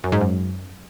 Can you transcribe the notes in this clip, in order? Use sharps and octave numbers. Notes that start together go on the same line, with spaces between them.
F#2
G#2
F#2